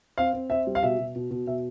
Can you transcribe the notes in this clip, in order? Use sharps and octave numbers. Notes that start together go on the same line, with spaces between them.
C4 F5
C4
C4 E5
G3
F5
B2 E5
B2
B2
B2
B2 E5